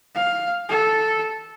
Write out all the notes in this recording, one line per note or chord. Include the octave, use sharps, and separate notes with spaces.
F5
A4